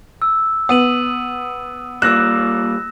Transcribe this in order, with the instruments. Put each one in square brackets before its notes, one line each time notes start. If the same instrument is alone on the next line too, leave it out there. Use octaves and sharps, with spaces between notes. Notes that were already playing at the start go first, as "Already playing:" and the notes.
[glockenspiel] E6
[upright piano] B3 [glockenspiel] D#6 D#7 F#7
[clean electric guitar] G3 A#3 F4 [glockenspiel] E6 A#6 E7 [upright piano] F#6